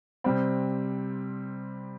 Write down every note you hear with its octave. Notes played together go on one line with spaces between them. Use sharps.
C3 G3 C4